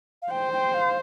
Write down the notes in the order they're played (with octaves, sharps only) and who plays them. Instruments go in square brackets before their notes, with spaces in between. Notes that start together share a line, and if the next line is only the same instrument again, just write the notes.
[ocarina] F5
[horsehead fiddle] C5 [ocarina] G5
[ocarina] G5
F5